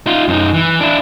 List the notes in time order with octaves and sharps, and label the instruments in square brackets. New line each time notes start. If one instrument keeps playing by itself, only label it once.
[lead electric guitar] D#4 F4
F#2 D#4
E3
D4 E4